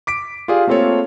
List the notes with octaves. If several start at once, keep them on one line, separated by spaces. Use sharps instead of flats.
D6 B6 D7
F4 G4 G#4 D5 F5
A3 A#3 C4 F4 A4 C#5